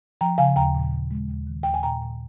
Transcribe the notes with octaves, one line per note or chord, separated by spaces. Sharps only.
F3 G5 A#5
C#3 F5 G#5
D#2 G5 A#5
A#2
A#2
G#3
D#2
D#3
D#2 G5
G#5
A#2 G5 A#5
A#2